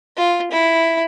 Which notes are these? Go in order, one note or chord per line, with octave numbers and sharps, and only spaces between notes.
F4
E4